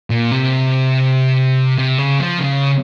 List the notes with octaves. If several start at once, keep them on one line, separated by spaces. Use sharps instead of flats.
A#2
C3
C3
C#3
F3
C#3